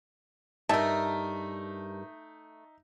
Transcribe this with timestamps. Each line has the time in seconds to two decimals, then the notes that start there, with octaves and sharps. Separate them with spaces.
0.69 G2 A3 D#4 A#4 E5 A5